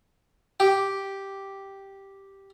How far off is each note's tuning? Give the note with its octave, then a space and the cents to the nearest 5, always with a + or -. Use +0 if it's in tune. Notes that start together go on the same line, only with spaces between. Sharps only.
G4 -5